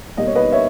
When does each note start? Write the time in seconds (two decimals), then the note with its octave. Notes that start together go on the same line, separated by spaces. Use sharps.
0.17 B2 G3 A#3 D#5
0.27 C#5
0.35 B4 D#5
0.52 C#5 E5